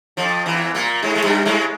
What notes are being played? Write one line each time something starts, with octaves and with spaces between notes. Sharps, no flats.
F2 F3
E2 E3
A#2 A#3
G#2 G#3
G#3
G2 G3
G#2 G#3